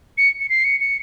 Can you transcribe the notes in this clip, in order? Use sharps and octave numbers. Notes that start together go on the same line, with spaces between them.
C#7
C#7
C7
C#7
C#7